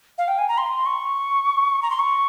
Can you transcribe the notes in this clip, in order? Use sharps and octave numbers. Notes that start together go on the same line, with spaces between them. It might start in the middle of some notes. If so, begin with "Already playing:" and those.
F5
G5
G#5
A#5
C6
C#6
A#5
C6
C#6